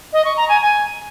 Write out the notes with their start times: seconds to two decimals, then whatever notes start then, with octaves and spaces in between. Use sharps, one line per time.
0.13 D#5
0.25 C#6
0.37 A#5
0.49 G#5
0.61 G#5